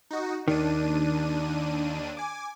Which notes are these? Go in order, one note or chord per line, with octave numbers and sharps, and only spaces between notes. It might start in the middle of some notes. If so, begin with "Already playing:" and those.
D#4 F#4
D#2 D#3 D4 D#7
G#5 D6